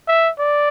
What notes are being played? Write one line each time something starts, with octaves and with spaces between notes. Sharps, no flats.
E5
D5